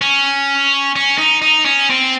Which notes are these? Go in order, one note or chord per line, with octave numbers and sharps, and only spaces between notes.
C#4
C#4
D#4
D#4
C#4
C4